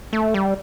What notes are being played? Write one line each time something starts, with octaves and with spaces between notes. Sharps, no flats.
A3
G3